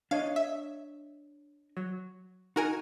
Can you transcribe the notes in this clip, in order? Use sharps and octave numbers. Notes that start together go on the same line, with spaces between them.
D4 C#5 D#5 F5
E5
F#3
D#4 F#4 A#4 G#5